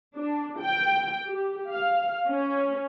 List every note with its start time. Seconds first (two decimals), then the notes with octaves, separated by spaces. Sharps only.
0.16 D4
0.60 G5
1.27 G4
1.69 F5
2.28 C#4